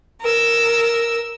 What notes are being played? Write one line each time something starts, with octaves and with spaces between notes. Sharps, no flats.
A#4 E6